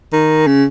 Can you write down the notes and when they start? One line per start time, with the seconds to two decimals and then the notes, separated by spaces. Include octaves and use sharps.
0.12 D#3
0.47 C#3